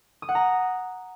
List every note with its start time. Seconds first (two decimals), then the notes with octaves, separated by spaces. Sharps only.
0.22 D#6
0.29 F#5
0.35 A#5